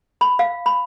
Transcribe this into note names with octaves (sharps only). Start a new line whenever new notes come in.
B5
F5
B5